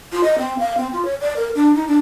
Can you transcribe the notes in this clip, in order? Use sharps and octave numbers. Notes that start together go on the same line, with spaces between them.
F4
D#5
C4
F5
C4
F4
C#5
D5
A#4
D4
D#4
D4